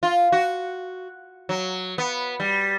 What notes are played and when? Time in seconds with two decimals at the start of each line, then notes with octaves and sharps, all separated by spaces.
0.03 F4
0.32 F#4
1.49 F#3
1.98 B3
2.40 G3